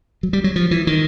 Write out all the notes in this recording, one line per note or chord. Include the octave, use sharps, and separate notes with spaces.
F#3
G3
F#3
F3
E3
D#3